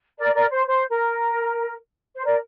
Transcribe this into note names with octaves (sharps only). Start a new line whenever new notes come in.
A#4 D5
A#4 D5
C5
C5
A#4
C5
A#4 D5